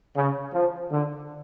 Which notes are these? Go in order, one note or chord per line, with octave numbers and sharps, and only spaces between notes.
C#3
F3
D3